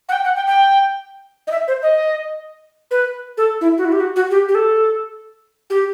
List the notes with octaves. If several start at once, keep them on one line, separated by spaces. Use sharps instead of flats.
F#5
G5
F#5
G5
G5
D#5
E5
C5
D#5
B4
A4
E4
F#4
E4
G4
F#4
F#4
G4
G4
A4
G4